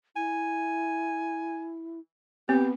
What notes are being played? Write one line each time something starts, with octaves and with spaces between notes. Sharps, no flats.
E4 G#5
B3 C4 G4